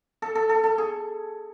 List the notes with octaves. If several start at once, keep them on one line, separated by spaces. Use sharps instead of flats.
A4
A4
A4
A4
G#4